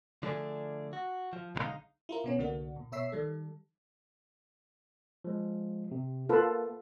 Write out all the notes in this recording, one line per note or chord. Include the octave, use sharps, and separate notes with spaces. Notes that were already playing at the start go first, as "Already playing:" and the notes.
D3 F3 A3 D4 E4 G#4
F#4
F3
B1 D3 E3 G#3 D#4 F5
E4 F4 A#4
B2 B3 C#4
C2 D3 A#3 D4 F#4
A#2
B2 C#5 E5 E6 B6 C7
D#3 G3 A4
F3 G#3
C3
A#3 F4 A4 B4